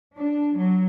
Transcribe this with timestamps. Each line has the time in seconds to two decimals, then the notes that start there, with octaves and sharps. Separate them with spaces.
0.15 D4
0.54 F#3